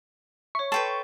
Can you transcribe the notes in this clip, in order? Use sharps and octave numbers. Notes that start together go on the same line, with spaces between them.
C#5 E5 C#6
A4 B4 G5 A5 C6 C7